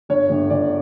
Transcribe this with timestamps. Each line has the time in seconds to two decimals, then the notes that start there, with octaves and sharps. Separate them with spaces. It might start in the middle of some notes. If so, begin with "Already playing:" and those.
0.09 G1 C#5
0.29 G1
0.50 G1 D5